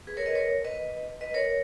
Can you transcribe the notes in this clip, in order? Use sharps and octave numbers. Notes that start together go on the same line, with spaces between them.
G#4 B4
A#4 C#5
B4 D#5
A#4 C#5
B4 D#5
B4 D#5
A#4 C#5